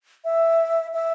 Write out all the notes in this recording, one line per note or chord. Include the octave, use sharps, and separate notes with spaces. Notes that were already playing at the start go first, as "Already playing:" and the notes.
E5
E5